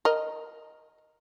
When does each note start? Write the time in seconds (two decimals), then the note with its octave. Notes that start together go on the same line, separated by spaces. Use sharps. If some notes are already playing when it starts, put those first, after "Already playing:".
0.05 A#4 D#5